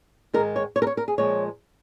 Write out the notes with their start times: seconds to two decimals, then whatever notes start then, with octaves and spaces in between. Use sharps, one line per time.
0.33 G#2 D#3 G#3 A#4
0.56 C#5
0.76 C#5
0.82 A#4
0.87 C#5
0.97 A#4
1.08 G#4
1.18 A#2 F3 G#3 C#5